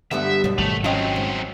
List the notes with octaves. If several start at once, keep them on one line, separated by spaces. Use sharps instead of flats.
G1 D3 G3 B3 E5
F#2 B2 G3
G#1 A3 F7 F#7
F#3 C4 C#4 F4 D#5 G5
G#2